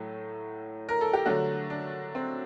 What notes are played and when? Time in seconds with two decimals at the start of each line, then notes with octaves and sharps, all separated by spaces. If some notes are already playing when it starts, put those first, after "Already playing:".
Already playing: A2 F#3 A3
0.89 A#4
1.01 A4
1.13 G4
1.26 D3 F#3 A3 D4 F#4
1.70 D4
2.15 C4